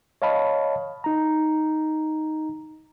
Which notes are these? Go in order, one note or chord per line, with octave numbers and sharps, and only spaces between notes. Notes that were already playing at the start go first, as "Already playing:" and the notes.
C#5 D#5 F5 A5 B5
D#4 A#5